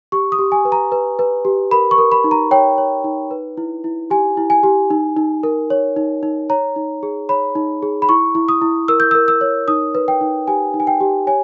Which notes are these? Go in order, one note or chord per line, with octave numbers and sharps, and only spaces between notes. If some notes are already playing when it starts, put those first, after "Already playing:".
G4 C#6
D#6
G4
G#5
B4
A#5
B4
B4
G4
A#4 B5
C#6
A#4
B5
D#4
A#5
C#5 G5
C#5
D#4
B4
E4
E4
G4 G#5
E4
G#5
G4
D#4
D#4
A#4
C#5
D#4
D#4
C#5 A#5
D#4
G#4
C#5 B5
D#4
G#4
B5
E4 C#6
E4
D#6
E4
A#4 E6
G6
E6
A#4
E6
C#5
D#4 D#6
B4
G5
D#4
G4 G#5
D#4
G#5
G5
G4
C#5 G#5